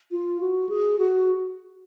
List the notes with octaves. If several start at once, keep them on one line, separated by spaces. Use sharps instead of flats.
F4
F#4
G#4
F#4